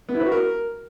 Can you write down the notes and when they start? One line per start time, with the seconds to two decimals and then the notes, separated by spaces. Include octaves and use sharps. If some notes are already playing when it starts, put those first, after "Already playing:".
0.09 B3
0.14 E4
0.20 B4
0.26 F#4
0.32 A#4